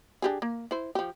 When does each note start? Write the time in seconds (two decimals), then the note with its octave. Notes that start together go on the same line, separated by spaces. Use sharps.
0.22 D4 G4 G#4
0.42 A#3
0.71 E4 C5
0.95 F3 G4